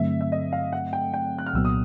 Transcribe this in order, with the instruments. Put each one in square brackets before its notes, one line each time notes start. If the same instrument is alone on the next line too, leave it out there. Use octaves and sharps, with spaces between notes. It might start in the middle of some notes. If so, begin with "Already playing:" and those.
Already playing: [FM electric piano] G2 D3 F#3 A3 C4 [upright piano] E5
[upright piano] E5
D#5
F5
F#5
G5
G5
F#6
F6
[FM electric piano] C2 A#2 F#3 B3 [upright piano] E6
[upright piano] D#6